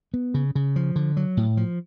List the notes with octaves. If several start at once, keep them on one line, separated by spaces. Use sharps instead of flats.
B3
C#3
C#3
F3
D3
F#3
A2
F3